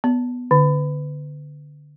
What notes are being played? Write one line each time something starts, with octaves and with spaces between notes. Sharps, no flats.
B3
D3